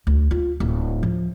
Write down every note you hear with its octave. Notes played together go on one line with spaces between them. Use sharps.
D2
F4
D1
F3